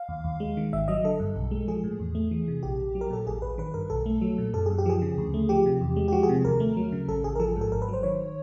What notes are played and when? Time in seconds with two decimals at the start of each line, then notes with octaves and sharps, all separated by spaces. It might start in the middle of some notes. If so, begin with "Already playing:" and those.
Already playing: F5
0.09 D#2
0.24 D#2
0.40 G#3
0.57 D#3
0.73 G#1 E5
0.88 F#3 D#5
1.04 D3 A4
1.20 G2
1.36 B1
1.51 G#3
1.68 F3 G#4
1.84 A2
1.99 E2
2.15 A3
2.31 E3
2.48 C3
2.63 A#1 G4
2.80 A#1
2.95 F#3
3.01 A#4
3.10 A#2 A4
3.27 A1 G#4
3.42 A1 B4
3.58 D#3 B4
3.74 G2 A#4
3.90 B1 A4
4.06 A3
4.22 F#3
4.38 A#2
4.53 F#2 A4
4.66 F#2 G#4
4.78 G4
4.86 F3 G#4
5.02 C#3
5.18 D2
5.34 A3
5.49 F3 G4
5.66 C3
5.81 E2
5.96 G#3
6.08 G4
6.12 F3 F#4
6.23 G#4
6.29 C3
6.45 D#2 A#4
6.60 A3
6.77 F#3
6.92 C#3
7.08 A1 A4
7.24 A1 G#4
7.35 A#4
7.39 F3 A4
7.57 G#2 A4
7.72 G#1 A#4
7.82 B4
7.88 F#3
7.93 C5
8.03 D#3 C#5